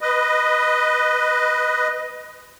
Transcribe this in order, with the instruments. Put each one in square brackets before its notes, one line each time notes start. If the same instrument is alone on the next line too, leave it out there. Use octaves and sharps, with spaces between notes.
[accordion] B4 D#5